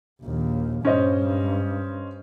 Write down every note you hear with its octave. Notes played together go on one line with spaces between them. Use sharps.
A#1 D#2
G2 C#4 C5 D#5